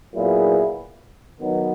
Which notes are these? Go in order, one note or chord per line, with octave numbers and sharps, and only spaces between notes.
A#2 F#3 B3 E4 G#4
D#3 F#3 B3